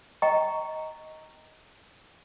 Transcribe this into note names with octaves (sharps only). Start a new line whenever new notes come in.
D#5 G5 A#5 C#6